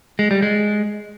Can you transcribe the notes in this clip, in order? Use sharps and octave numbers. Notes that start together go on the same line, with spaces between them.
G#3
G3
G#3